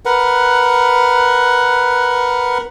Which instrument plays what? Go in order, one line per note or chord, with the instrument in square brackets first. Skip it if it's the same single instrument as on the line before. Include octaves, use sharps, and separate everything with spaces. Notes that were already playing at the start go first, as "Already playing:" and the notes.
[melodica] A#4 B4 F#5